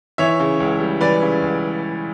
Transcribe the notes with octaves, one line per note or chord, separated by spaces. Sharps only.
E3 C#5 E5
C#3
C#2
G3
E3 B4 D5
C#3
C#2